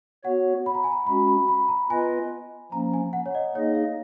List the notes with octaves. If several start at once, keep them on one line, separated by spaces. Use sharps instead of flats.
B3 F#4 C#5 F#5
B5
A#5
G#5
A#5
G#3 C#4 F#4 B5
B5
B5
A#5
B3 F4 B4 D#5 G#5
F3 A#3 C#4 A#5
G#5
F#5
C#5
D#5
A#3 D#4 G#4 C#5 D#5
F5